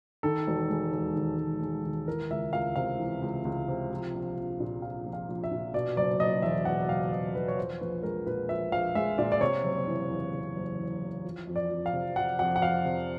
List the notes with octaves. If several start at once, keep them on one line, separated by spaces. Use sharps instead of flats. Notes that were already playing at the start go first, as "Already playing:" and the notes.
D#3 A4
E1
G#3
D#2
D#3
E1
G#3
D#2
E3 A#4
C#2 E5
C#2 F5
C3 F5
E3
C#2
C#2
C3
F3
A#1
A#1
A#2
F3 F5
A#1
F5
A#1
E5
A#2
B2 D5
F#1 D5
F#1 D#5
E2 E5
B2 F#5
F#1 F5
F#1 D#5
E2 B4
C#5
F3 C5
A#1 B4
G#3 A#4
A#2 B4
F3 E5
A#1 F5
G#3 E5
A#2 D5
D5
C3 C#5
F#1
E3
E2
C3
F#1
E3
E2
F3
F2
D5
F2
F5
C3
F3 F#5
F2 F#5
F#5
F2 F5
C3